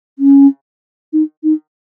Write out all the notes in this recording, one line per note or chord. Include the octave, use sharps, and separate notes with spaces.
C#4
D#4
D#4